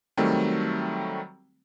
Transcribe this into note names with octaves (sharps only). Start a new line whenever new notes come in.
D#3 F#3 G3 A3 C4